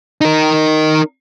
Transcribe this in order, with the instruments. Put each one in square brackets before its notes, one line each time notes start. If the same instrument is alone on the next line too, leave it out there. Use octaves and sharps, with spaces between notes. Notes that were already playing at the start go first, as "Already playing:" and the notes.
[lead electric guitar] D#4 A#4